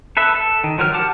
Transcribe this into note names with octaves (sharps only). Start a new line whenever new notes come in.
A4 B4 E5
A4
D#3
F3 F#3 A#4 F6
G4 F#5 A5 D6 F6